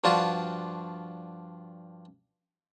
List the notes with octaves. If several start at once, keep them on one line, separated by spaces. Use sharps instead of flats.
G2 F3 D4 F4 F#4